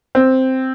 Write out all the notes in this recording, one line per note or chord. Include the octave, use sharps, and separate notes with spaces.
C4